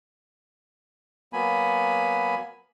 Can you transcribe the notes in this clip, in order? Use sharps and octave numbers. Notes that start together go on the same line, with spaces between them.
F#3 A#3 B3 G#5 B5